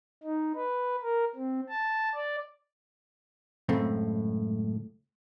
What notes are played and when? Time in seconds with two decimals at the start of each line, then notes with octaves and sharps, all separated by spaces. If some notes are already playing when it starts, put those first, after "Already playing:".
0.23 D#4
0.55 B4
1.03 A#4
1.35 C4
1.69 A5
2.15 D5
3.69 C#2 F#2 A2 A3 C4